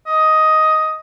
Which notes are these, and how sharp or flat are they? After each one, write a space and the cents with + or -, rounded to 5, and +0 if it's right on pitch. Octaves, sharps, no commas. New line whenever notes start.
D#5 +10